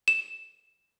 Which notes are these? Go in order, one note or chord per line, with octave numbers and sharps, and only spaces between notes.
E7